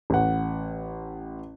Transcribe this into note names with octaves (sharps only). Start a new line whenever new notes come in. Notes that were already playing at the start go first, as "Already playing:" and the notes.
A1 F#5